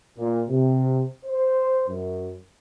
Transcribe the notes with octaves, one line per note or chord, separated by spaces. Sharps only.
A#2
C3
C5
F#2